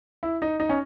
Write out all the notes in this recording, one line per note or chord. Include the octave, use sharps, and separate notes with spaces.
E4
D#4
D#4
C#4